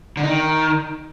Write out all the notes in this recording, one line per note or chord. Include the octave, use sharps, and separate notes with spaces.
D3
D#4
D#3